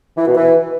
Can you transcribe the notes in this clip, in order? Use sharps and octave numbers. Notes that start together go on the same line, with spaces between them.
E3
B2
E3